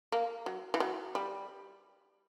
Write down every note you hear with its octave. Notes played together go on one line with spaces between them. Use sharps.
A#3
F#3
E3
F#3
G3